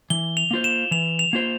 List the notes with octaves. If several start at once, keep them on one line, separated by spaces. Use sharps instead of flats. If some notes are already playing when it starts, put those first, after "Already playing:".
E3 G7
F7
A#3 F4 C5
E7
E3 F7
F7
A#3 F4 C5